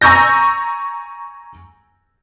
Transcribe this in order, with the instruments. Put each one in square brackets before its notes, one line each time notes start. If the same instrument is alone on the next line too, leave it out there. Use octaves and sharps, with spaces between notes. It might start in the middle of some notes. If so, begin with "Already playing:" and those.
[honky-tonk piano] G#5 A#5 C#6 E6 G6 A#6